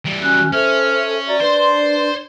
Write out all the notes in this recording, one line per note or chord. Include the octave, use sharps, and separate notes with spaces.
E3 G3
C#4 F#4 F#6
C#4 A4 C5 E5 F6
F#4 D5 E5 A#5
D4 B4 C5 C6